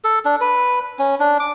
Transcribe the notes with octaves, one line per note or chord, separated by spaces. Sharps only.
A4
D4
B4
C#4
D4
D6